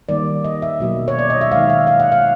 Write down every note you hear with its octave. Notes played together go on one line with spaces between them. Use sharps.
D#3 G3 A#3 D5
D#5
E5
B2 F#3 A#3
C#5
D5
D#5
E5
D#3 G#3 F5
E5
F5
F#5
F5